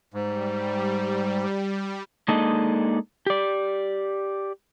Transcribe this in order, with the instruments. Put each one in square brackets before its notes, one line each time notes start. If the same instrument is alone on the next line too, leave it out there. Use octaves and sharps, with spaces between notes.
[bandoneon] G#2 [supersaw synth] G3
[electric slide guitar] G#3 A#3 D4 D#4 A4 D#5
G4 D5